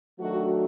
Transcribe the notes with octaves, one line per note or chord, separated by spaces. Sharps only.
D#3 F#3 A3 D4 F#4